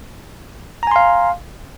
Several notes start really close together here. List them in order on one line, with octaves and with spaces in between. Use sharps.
A#5 G#5 C6 F5